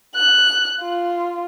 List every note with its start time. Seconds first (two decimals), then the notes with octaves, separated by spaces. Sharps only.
0.16 F#6
0.81 F4